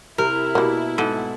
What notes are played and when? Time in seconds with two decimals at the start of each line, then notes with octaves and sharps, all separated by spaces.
0.18 C3 E4 A#4
0.55 B2 G3 A#3
0.98 G#2 A4